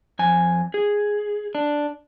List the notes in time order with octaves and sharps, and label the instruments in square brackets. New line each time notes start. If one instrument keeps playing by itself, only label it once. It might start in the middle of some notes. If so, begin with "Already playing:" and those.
[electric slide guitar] F2 G#5
G#4
D4